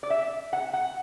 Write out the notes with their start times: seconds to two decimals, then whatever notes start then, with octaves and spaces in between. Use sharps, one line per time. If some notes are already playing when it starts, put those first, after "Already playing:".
0.03 D5
0.10 E5
0.53 F#5
0.73 F#5